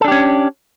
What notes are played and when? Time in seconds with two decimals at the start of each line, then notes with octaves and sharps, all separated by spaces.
0.01 A4
0.04 D4
0.08 G4
0.11 C#4